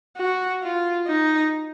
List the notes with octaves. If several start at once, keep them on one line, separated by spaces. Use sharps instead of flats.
F#4
F4
D#4